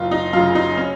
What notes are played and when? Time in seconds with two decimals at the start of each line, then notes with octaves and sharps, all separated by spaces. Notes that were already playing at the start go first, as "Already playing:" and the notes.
Already playing: F#1 F4
0.11 D#4
0.33 F#2 C#3 F4
0.55 D#4
0.78 C#4